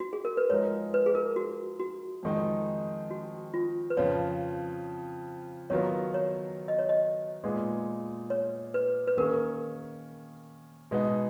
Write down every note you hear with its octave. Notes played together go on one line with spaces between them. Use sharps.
F#4
G#4
A#4
B4
F3 G#3 D#4 A#4 C#5
B4
G#4
A#4
F#4
F#4
F2 D#3 G#3 D#4
F#4
F4
B4
F2 C#3 F3 C#5
D#3 F#3 B3 F4 A#4 C#5
C#5
D#5
C#5
D#5
A#2 G#3 B3 D#4 G#4
C#5
B4
B4
D#3 A#3 C#4 G#4 A#4
B2 G#3 B3 D#4